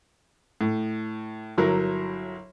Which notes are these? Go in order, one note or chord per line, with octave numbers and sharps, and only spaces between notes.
A2
G1 F#3 E4 A#4